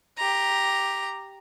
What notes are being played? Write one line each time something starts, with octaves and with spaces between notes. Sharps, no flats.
G4 A#5